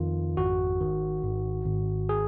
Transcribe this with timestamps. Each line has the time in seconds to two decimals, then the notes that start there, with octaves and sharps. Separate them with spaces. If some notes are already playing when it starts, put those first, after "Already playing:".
Already playing: F2 D#3 F4
0.37 G#1 F#4
0.81 D#3
1.23 G#1
1.67 G#1
2.09 G#4